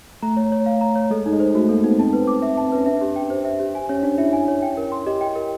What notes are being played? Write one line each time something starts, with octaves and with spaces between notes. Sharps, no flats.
A3 A#5
C#5
C#5
F5
A#5
C#5
G#3 A4
D#4
G#3
C5
A3 F#4
A#3 A4
B3 D#4
C4 A5
B4
D6
E5
A5
C4
C#4 B4
D4 E5
G4
G5
C5
E5
G4
G#5
C#4 C#5
D4 C#5
E4 E5
G#5
C#5
G5
A#4
C6
G4 D#5
G5
A#4